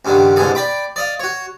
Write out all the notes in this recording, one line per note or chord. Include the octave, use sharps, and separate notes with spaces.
C#2 G2 D3 D#3
C2 G#2 B2 D3 G#4 A4
D5 G5 B5 D6
D5 D#5 F5
F#4 C#5